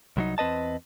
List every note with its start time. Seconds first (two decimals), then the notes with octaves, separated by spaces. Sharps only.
0.17 C2 F#3 D#4
0.38 E2 C4 B4 D#5 A5